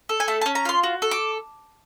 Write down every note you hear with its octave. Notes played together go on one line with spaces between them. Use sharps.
A4
G#5
A3 A5
C#4 A5
A#5
F4 C6
F#4
A4
D6